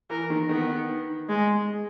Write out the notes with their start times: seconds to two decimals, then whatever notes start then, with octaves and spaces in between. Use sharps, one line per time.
0.10 E3 A#4
0.30 D#3
0.49 D#3 B3
1.29 G#3